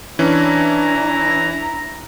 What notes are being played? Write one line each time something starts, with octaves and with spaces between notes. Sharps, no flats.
E3 C#4 D4 E4 A#5